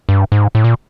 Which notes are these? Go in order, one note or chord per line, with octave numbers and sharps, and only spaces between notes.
G2
G#2
A2
A#2